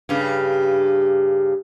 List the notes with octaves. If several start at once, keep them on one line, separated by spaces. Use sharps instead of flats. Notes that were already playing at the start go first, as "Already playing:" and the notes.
G2 C#3